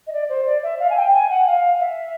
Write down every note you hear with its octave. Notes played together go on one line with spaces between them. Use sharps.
D#5
D5
C5
D5
E5
F5
G#5
G5
G#5
F#5
F5
E5